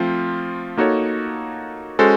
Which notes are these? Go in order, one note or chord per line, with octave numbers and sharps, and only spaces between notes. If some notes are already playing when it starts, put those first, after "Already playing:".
Already playing: F3 A3 C4 F4
A#3 D#4 F#4 A4 C#5
G#3 C#4 F#4 A4 C5